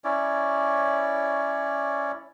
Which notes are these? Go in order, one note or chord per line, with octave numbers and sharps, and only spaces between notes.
C#4 E4 C#5 D5